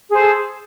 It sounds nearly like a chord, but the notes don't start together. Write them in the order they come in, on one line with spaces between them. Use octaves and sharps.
G#4 C5 A4